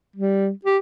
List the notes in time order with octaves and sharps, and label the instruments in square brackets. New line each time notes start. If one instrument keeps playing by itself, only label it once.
[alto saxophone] G3
G4